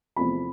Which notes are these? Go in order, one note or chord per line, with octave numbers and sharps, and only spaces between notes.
E2 C3 F3 A3 C4 B5